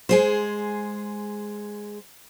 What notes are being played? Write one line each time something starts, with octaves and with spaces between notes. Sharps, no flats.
G#3 G#4 C5